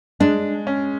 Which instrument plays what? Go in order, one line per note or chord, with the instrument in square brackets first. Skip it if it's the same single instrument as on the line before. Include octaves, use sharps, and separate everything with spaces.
[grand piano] G#3 [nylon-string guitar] D4
[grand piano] C#4